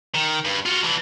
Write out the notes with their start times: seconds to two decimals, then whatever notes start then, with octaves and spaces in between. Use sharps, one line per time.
0.14 D#3
0.45 G2
0.66 F4 F#4
0.83 E3 D4